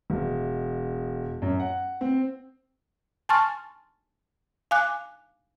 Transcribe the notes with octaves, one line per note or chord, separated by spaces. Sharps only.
E1
F#2
F#5
C4
G#5 A5 C6 C#6 F6 A6
F5 G#5 D6 F#6